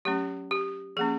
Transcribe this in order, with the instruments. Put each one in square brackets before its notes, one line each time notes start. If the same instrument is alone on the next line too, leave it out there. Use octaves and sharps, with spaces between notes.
[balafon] F#3 A3 C#4 G4
G4
F3 A#3 C#4 G#4